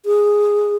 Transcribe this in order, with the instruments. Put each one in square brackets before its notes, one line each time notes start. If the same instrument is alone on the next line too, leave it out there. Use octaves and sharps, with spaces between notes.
[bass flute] G#4